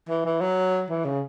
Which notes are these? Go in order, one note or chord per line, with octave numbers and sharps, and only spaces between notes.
E3
E3
F#3
E3
C#3